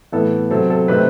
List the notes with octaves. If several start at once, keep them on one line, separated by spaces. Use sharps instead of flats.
A2 E3 B3 A4
C3 F#3 C4 A4
A4
C3 D#3 A3 C4 B4